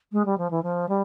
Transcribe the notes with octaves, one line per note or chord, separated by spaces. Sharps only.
G#3
G3
F3
E3
F3
G3